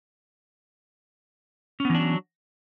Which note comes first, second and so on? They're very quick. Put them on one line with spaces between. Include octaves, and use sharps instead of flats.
C#4 B3 E3 D4 F#3